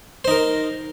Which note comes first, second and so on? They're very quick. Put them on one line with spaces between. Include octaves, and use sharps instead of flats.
C5 D#4 A#4